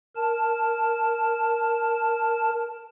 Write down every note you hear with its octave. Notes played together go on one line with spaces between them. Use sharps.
A#4 A5